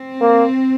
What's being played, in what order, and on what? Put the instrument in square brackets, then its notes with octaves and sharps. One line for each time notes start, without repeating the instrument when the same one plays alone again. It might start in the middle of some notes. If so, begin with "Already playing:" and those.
Already playing: [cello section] C4
[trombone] A#3